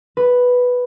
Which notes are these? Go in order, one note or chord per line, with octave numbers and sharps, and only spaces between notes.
B4